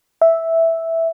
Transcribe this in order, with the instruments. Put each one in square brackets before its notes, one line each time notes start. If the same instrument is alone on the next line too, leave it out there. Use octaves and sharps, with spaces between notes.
[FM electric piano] E5